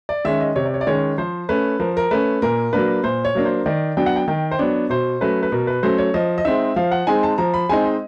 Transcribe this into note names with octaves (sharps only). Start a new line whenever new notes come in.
D5
D#3 G#3 C#4 E5
D#5
C3 C#5
D5
C#5
D5
D#3 G#3 C#4 C#5
F3 C5
A3 C#4 B4
F3 A#4
A#4
A3 C#4 B4
A#2 A#4
F#3 A#3 D4 B4
A#2 C5
C#5
F#3 A#3 D4
C5
D#3 D5
F#3 B3 D4 G5
F#5
G5
D#3 G5
C5
F#3 B3 D4 C#5
B2 C5
F#3 A3 C#4 B4
B4
B2 A#4
B4
F#3 A3 C#4 C5
C#5
F3 D#5
D#5
G#3 C4 D#4 E5
F3 F5
F#5
G#3 C4 D#4 G#5
A5
F3 A#5
B5
G#3 C4 D#4 G#5
D#5